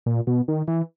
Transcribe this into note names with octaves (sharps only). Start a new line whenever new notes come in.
A#2
B2
D#3
E3